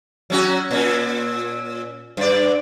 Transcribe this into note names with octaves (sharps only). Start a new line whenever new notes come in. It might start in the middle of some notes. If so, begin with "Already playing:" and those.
F#3 C#4 F#4
A#2 C#4
G2 D5